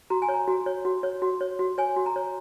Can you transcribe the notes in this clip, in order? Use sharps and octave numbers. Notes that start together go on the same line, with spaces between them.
F#4 A#5
G#5
C#5
A#5
F#4
C#5
F#4
C#5
F#4
C#5
F#4
C#5 G#5
F#4
A#5
C#5